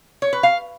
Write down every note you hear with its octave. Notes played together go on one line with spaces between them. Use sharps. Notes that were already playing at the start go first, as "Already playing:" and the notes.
C#5
B4
F5